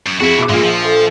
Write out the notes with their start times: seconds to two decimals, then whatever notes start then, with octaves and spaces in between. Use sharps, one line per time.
0.06 F#2
0.20 F2 E4 F#4 G#4
0.38 B2 D6
0.49 A#1 A#2 G#3 A#3
0.63 F3
0.85 A4